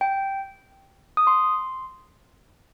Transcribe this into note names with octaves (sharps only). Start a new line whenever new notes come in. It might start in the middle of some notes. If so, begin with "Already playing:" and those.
G5
D#6
C6